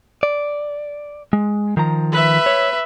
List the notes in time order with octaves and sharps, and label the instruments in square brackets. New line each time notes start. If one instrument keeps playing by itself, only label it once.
[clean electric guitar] D5
G#3
D#3 F3 A#5
[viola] B4 E5
[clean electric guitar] C#5